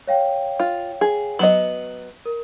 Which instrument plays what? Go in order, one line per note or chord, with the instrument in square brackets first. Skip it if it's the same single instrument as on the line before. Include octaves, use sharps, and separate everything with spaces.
[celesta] C#5 F5 G5
[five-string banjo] F4
G#4
[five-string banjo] F#3 B3 D#5 [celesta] F#7
[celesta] A#4